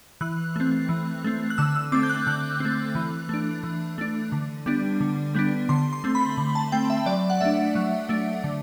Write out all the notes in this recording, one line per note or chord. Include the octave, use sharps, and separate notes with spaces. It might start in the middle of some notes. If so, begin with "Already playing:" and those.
E3 F#6
A3 C4
E3
A3 C4
F#6
D3 E6
E6
A3 C4 D6
G6
F#6
D3 F#6
A3 C4
E3
A3 D4
E3
A3 D4
D3
G3 B3 D4
D3
G3 B3 D4
D3 C6
C6
A3 C4
B5
D3
A5
A3 C4 G5
E5
F#3 D5
F#5
A3 D4 E5
F#3
A3 D4
D3